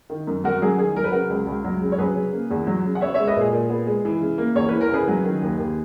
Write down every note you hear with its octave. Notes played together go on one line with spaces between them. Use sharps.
D#3
F#2
F#2 F#4 A#4
F#3 G#4
D#3 G#4
F#3 A#4
B4
C#3 F#4 A#4
C#2
C#2
F#3
C#3
C#5
F#3 G#4 B4
C#3
A#3
E2
F#3
C#3
F#5
B3 C#5 E5
G#3 C#5 E5
B4 D#5
A#2 G#4
A#2
B3
G#3
E3
C#3
A#3
E2 C#5
E3 B4
A#4
C#3 G#4 B4
F#3
D#3
D#2
D#2